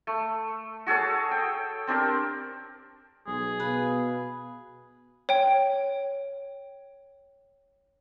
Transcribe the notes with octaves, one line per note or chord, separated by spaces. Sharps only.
A3
F#4 G#4 A4 C#5
G5
C4 D4 G4 A#4
B1 G#4
B2 B4 F5
C#5 G5